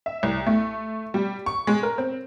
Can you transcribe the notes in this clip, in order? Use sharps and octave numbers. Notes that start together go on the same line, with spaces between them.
E5
C2
A3
G3
C#6
G#3
A#4
C4